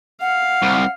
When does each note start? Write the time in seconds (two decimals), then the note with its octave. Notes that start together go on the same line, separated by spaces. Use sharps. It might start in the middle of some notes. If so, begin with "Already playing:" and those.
0.21 F5 F#5
0.62 C2